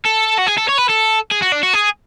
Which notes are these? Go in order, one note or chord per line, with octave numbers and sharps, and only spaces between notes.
A4
F#4
G#4
A4
C#5
B4
A4
G#4
F#4
D4
F#4
G#4